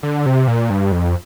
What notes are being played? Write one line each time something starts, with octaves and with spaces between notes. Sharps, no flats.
D3
C3
A#2
G2
F2